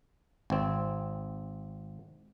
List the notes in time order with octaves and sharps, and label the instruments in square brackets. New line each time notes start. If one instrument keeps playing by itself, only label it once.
[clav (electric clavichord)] G#1 C4